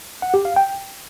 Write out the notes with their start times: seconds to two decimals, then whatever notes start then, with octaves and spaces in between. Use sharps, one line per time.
0.22 F#5
0.34 G4
0.45 F5
0.56 G5